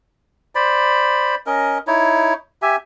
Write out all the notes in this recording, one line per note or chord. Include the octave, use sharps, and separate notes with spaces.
C5 D5 B5
C#4 A#4 D#5
D#4 E4 C#5
G4 E5 G#5